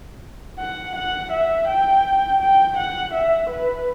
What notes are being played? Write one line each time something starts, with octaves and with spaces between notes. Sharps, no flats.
F#5
F#5
E5
G5
G5
F#5
E5
B4